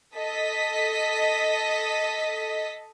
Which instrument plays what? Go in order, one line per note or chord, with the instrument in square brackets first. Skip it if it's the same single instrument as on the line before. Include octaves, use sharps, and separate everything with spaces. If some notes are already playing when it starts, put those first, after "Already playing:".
[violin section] A4 D#5 B6